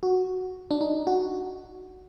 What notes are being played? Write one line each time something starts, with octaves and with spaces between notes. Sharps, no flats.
F#4
D4
D#4
F#4